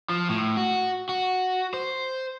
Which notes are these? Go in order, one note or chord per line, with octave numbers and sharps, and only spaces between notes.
F3
A2
F#4
F#4
C5